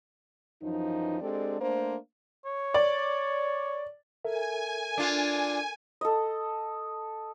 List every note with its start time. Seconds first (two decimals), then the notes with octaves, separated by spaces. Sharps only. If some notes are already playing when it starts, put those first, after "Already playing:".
0.62 F#2 E3 F3 D#4
1.21 G#3 C4 D4 G4 A4 D5
1.61 A3 A#3 D4 C5
2.46 C#5
2.74 D5
4.25 A4 A#4 E5 G#5
4.98 D4 F4
6.01 A4 D#5